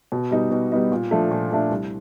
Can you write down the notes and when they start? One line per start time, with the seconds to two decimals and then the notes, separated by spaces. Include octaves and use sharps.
0.12 B2
0.31 G3 B3 D#4
0.51 B2
0.72 G3 B3 D#4
0.92 A#2
1.11 F3 A3 D4
1.31 A#2
1.51 F3 A3 D4
1.71 C2